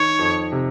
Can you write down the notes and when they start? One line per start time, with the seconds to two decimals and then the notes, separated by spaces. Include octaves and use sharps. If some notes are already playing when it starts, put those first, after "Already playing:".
Already playing: D#3 C#5
0.19 F2
0.52 C3